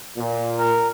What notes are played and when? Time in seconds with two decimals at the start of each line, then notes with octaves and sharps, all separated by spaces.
0.17 A#2
0.59 A#4